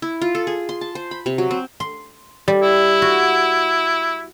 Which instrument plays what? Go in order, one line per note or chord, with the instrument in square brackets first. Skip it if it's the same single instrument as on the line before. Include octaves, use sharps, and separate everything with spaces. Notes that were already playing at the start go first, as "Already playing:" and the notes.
[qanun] E4
F4
A4
G#4
C6
A5
C5
B5
C3
F#3
C4
[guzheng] C6
G3
[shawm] E4
[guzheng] F#4